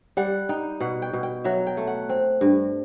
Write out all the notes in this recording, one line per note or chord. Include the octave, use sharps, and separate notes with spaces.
G3 F#5
D#4 G5
B2 F#5
G5
B2
G5
F#3 E5
G5
A3
F#5
C4
G2